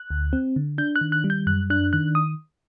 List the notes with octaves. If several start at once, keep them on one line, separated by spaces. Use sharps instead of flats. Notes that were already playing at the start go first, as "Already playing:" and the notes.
Already playing: F#6
D2
C4
D3
D4 G6
F#6
D#3
F#6
G3
G6
F#2 F#6
D4 F#6
D#3 F#6
D#6